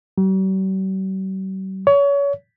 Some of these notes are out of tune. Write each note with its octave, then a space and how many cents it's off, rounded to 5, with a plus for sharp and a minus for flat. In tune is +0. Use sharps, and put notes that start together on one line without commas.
G3 -45
C#5 +30